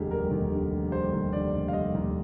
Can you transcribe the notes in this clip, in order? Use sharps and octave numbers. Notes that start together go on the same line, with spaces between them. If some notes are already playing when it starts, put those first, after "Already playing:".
Already playing: F1 D#2 D3 G3 G4 G#4
G3 A#4
D#2
D3
F1
G3 C5
D#2
D3 D5
F1
F5
G3 D#5
D#2